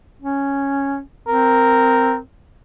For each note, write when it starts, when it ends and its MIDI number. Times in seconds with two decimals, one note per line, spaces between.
0.22 0.99 61
1.28 2.20 60
1.28 2.17 70